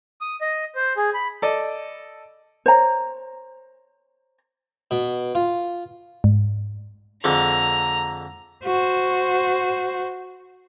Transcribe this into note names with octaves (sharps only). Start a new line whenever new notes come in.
D#6
D#5
C5
G#4
B5
A4 D5 D#5
C5 C#5 A#5
B2
F4
G#2
F2 D3 G#3 A#5
F#4 C5